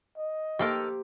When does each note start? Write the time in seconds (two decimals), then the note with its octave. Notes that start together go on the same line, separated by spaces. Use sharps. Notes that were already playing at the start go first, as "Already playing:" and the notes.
0.17 D#5
0.59 D#3 A#3 G4 A4 A#4 C5